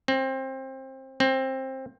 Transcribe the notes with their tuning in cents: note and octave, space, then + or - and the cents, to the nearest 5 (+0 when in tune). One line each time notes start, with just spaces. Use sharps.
C4 +25
C4 +20